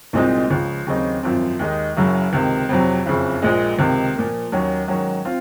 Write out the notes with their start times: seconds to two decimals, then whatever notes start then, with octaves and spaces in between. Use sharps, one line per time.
0.13 C2 A#2 G#3 C4 D#4
0.50 C#2 C#3 F3
0.87 D#2 C#3 F#3 C4 D#4
1.23 G#1 F#2 F3 C4
1.59 D#2 D#3 G#3 D#4
1.97 F#1 F#2 C#3 F#3
2.33 C#2 C3 D#3
2.69 F2 C3 F#3
3.06 F#1 F2 C#3
3.42 A#1 A#2 G#3
3.79 C#2 C3 D#3
4.15 A#2 F3 A#3
4.52 D#2 D#3 F#3 C#4
4.88 G#2 D#3 F#3 C#4
5.25 C4 F4